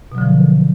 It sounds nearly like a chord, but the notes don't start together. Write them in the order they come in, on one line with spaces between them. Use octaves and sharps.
B2 F#3 D3 F3